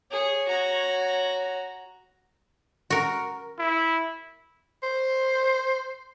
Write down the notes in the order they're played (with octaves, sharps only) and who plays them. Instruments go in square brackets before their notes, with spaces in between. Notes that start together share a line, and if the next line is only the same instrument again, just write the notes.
[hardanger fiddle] G#4 [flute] C#5
[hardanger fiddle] F#4 A#5
[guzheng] F#4 A#4
[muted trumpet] E4
[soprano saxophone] C5